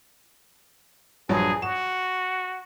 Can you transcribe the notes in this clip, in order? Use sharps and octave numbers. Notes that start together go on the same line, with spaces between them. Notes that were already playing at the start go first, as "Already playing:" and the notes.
A#1 G2 F#3 G#4
F#4 E7